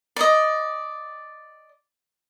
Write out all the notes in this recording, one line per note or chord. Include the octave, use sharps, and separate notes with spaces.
D5 D#5